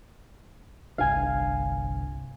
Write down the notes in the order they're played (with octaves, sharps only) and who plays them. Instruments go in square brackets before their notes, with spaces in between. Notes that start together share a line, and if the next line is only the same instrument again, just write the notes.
[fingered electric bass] G1 C2 D4 [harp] F5 G#5